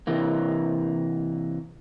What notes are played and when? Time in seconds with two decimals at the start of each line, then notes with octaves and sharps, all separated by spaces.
0.07 C3 E3 A#3